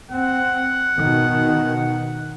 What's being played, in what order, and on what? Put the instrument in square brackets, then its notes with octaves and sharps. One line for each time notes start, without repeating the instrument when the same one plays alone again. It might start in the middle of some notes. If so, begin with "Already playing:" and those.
[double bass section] C4 [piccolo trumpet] F#5
[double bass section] B2 D#3